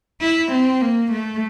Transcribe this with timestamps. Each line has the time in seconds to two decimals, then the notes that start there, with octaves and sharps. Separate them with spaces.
0.21 E4
0.52 C4
0.81 A#3
1.12 A3